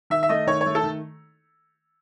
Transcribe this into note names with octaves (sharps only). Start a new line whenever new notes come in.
D#3 E5
E5
A3 D#5
D#3 C#5
C#5
A3
A4
D#3